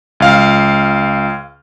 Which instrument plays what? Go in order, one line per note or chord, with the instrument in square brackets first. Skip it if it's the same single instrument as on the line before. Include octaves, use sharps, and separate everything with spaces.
[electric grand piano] C#2 F5 F6